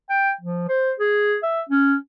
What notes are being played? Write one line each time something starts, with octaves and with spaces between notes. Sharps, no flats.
G5
F3
C5
G#4
E5
C#4